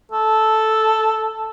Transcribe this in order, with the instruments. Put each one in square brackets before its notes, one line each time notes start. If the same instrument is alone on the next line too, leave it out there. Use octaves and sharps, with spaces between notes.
[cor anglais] A4